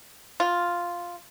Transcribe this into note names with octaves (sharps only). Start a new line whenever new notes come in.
F4